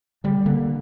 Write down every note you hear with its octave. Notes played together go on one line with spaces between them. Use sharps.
D3 G3
D3 A#3